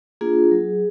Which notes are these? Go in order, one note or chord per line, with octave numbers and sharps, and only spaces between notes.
A#3 D4 F4 G#4
F#3